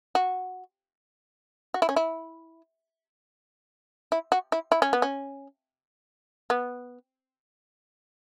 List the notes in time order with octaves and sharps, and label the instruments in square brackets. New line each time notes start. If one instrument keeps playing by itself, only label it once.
[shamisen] F#4
F#4
E4
C#4
E4
E4
F#4
E4
E4
C#4
B3
C#4
B3